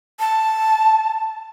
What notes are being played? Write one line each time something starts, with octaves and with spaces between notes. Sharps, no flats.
A5